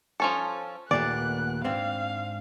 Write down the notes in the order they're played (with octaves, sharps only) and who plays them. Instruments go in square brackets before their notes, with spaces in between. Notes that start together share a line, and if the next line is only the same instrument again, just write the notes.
[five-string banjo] F3 C#4 A4
[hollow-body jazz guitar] D#2 A#2 A3 [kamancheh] B3 F#6 [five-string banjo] D5
[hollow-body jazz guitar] G#2 C4 D4 [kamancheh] F5